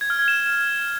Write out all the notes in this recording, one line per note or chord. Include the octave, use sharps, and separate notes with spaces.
G#6
F6
G#6
E7